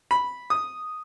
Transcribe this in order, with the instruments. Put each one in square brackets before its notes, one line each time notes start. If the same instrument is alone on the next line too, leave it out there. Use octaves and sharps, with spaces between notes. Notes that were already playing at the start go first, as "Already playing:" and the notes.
[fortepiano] B5
D#6